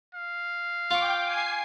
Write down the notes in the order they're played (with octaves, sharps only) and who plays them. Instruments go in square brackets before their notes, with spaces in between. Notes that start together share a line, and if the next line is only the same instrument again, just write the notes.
[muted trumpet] F5
[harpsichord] F4 C#6 [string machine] G5 D6
[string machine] G#5 C7